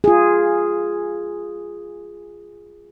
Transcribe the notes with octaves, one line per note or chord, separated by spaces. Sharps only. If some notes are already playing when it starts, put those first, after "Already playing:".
F4 G#4